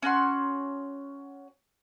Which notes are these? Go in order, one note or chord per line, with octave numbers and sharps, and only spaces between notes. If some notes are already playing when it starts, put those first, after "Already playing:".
C#4 F#4 F#5 C6